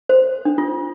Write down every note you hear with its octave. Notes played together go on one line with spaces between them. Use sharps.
C5
D4
F4